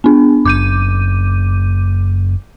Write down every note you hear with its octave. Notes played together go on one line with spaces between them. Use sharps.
B3 D4
F#1 D6 G6 D#7